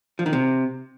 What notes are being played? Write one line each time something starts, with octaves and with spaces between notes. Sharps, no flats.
F3
D#3
C3